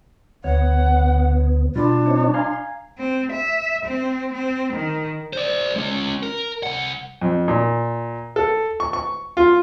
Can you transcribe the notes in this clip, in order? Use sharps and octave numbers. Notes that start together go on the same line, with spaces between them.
D2 B3 C#5 F#5
B2 G3 D4 F4
C4 D#4 C#5
F5 G#5 A#5 C6
C4
E5
C4
C4
D#3
C5 D5
G#3 C#4
A#4
C2 F#5
F2
A#2
A4
C#6
C#6
F4